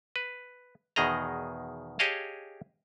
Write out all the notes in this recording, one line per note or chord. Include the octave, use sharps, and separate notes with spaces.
B4
E2 B2 D#3 G#4 D#5 A#5
G4 G#4 C#5 D#5 F5 A5